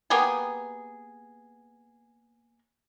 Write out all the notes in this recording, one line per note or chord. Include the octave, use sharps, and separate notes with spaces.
A#3 B3 G4 G#4